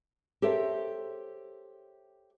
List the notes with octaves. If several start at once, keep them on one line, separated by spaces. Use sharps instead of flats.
G4 A4 A#4 C5 C#5 E5